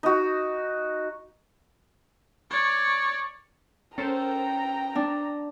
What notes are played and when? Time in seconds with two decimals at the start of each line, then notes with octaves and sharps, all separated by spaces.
0.03 D#4 F#4
2.50 C#5 D5
3.98 C#4 A4 A#4 C5 G5 A#5
4.95 D4